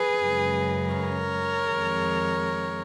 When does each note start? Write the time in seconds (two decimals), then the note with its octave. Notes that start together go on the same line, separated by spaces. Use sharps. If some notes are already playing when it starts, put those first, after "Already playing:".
Already playing: G#4 B4
0.22 F#2 C#3 G#3
0.94 A#4 C#5
1.66 F2 D#3 G#3